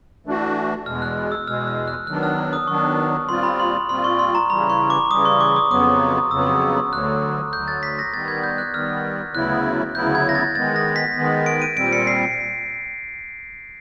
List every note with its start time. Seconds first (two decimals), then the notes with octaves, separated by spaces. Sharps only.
0.26 E3 A3 D4 F#4
0.86 E2 B2 G#3 F6
1.02 F#6
1.32 E6
1.47 E2 B2 G#3 F6
1.67 F6
1.88 F#6
2.07 D#3 F#3 B3 D4 F#6
2.23 F6
2.53 D#6
2.67 D#3 F#3 B3 D4 C#6
3.29 A#2 G3 C4 F4 C6
3.43 B5
3.60 C6
3.89 A#2 G3 C4 F4 C6
4.04 C#6
4.19 C6
4.35 A#5
4.50 C#3 E3 G3 B5
4.70 C#6
4.90 D6
5.10 C#3 E3 G3 D#6
5.25 C#6
5.40 D6
5.56 D#6
5.71 F2 C#3 F#3 B3 D#6
6.31 F2 C#3 F#3 B3 E6
6.92 D2 D3 F#3 F#6
7.53 D2 D3 F#3 G6
7.68 A6
7.83 B6
7.99 A#6
8.13 D#3 G3 B3 A6
8.28 G#6
8.44 G6
8.58 F#6
8.74 D#3 G3 B3 F6
9.34 D2 C#3 F#3 B3 E4 F#6
9.95 D2 C#3 F#3 B3 E4 G6
10.15 G#6
10.29 A#6
10.35 A6
10.55 D#3 G#3 B3 A6
10.76 A#6
10.96 B6
11.16 D#3 G#3 B3
11.46 D7
11.62 D#7
11.77 A#2 G3 C4 D7
11.93 C#7
12.07 C7